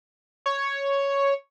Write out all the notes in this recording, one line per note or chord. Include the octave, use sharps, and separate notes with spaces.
C#5